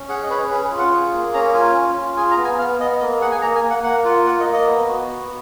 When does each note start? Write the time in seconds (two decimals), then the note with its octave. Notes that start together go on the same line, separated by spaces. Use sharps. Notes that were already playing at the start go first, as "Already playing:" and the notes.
Already playing: C#4
0.09 G#4 F#5
0.23 D#5
0.30 C#4 B4
0.37 C#5
0.51 G#4 B4
0.65 G#4
0.71 F4
0.79 F#5
0.92 G#4
1.13 A#3
1.34 C#4 A#5
1.54 F4 G#5
1.75 C#4
1.97 F4
2.17 G#4 G#5
2.31 A#5
2.38 B3
2.45 G#5
2.58 B3 F5
2.79 B3 D#5
3.00 A#3 D#5
3.21 G#4 F#5
3.32 G#5
3.42 A#3 A#5
3.55 G#5
3.63 A#3
3.70 F#5
3.83 A#3 F#5
4.05 F4
4.26 A#3 F#5
4.40 D#5
4.46 A#3
4.53 D#5
4.67 B3
4.88 F#4
5.08 B3